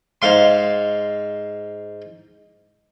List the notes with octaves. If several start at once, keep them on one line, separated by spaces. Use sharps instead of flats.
G#2 F5 C6